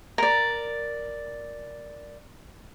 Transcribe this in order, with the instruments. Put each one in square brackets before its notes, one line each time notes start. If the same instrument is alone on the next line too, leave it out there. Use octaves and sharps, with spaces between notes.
[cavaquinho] A#4 D5